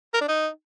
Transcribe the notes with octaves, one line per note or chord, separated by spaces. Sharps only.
A#4
D4
D#4